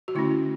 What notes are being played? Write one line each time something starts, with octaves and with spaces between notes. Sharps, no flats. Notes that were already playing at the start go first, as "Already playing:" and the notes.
F#4
D3 A3 C#4 E4